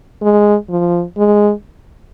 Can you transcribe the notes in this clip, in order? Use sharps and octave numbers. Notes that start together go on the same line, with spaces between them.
G#3
F3
G#3